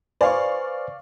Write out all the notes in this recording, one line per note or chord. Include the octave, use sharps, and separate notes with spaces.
B4 C5 D5 F5 G#5 C#6